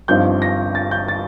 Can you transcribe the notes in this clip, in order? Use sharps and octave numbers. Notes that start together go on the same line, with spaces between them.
G1 G2 F3 C4 D#4 G6
A#6
A6
G6
A6